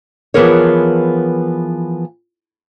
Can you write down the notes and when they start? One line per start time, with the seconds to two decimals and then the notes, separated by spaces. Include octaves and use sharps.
0.34 E3 F3 B3 G#4 A#4 C#5